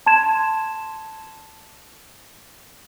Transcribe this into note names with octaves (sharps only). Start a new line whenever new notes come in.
A5 C6 G#6 E7